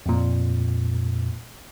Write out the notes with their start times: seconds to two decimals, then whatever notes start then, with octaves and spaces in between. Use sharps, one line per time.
0.06 F2 A#2